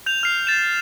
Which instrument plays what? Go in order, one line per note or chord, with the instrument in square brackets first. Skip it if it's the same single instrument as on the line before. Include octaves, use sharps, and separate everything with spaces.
[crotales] G6 F7
F6 C7
A6 E7